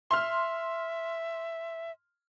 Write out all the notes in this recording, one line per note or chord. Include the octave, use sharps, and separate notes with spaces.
E5 C6 F6